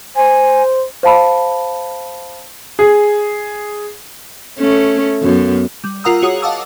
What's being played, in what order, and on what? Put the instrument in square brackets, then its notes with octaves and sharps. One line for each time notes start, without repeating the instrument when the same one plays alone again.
[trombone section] C5 [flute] G#5
[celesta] C5 F5 A5 B5
[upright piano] G#4
[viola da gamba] A3 C#4
F#2 B3
[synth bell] G3
F4 A#4 F#5 A#5 D#6 E6
F#4 G#4 C#5 F#5 D#6
D#5 F5 F#5 A5 D6 E6